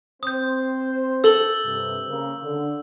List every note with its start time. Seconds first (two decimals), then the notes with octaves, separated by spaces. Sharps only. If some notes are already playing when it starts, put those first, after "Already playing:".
0.23 C4 C5 D#6 G6
1.24 A4 E6 F#7 G7
1.65 G2 C3
2.09 C#3 A#3 A#4
2.42 D3